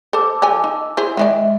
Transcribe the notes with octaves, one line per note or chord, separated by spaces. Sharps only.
A4 C5 A5 D6 E6
F3 A4 G#5
D#4
E4 G#4 C5
D#3 E3 G#3 D5 E5